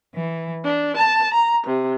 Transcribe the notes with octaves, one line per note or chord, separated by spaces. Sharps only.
E3
D4
A5
A#5
C3